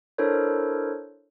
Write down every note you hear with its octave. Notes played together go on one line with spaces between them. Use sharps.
D4 E4 A4 A#4 C5 C#5